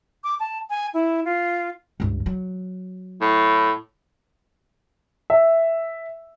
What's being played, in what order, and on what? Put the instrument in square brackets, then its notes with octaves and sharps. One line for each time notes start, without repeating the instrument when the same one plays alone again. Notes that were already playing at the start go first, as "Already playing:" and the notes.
[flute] D6
A5
G#5
E4
F4
[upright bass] C#2 G2
F#3
[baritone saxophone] A2
[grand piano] E5